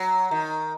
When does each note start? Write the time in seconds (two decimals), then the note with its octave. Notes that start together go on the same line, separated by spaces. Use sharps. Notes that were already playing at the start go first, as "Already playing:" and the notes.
Already playing: F#3
0.31 D#3